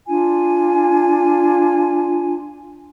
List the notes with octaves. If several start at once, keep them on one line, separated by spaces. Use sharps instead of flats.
D4 F4 G#5